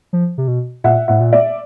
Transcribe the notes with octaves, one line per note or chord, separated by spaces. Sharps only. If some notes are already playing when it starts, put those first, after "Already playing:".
F3
C3
B2
A#2 E5 F#5
A2 E5 F#5
A#2
D5 E5